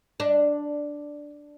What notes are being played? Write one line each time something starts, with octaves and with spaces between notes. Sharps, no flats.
D4